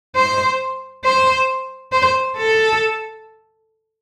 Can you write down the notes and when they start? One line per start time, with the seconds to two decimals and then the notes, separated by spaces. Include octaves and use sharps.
0.16 C5
1.05 C5
1.92 C5
2.37 A4